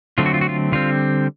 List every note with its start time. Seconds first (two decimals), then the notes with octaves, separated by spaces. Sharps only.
0.18 D3 F#3 A3 C4 F4
0.26 F#4
0.34 F4
0.41 F#4
0.49 F4
0.72 D3 G3 C4 F4